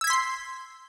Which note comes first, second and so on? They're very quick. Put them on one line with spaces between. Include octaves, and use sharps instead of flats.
E6 G#6 B6 C6 C7